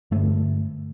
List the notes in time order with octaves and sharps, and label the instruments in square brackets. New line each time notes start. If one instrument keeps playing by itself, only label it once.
[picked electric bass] G2 D3 A3